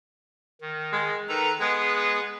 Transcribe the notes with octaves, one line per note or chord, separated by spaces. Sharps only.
D#3
G#3
D#3 A4 B4 A#5
G#3 B3 G#4 B4